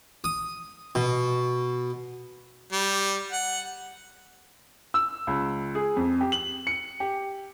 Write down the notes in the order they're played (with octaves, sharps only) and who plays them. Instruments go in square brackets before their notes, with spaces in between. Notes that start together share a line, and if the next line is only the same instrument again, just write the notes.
[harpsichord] D#6
B2
[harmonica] G3
F#5
[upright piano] E6
C#2
G#4
F2
G4
F#7
C#7
G4